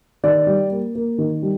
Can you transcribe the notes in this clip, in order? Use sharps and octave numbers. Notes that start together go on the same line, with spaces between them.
D#3 D5
G3
A#3
A#3
D#3
G3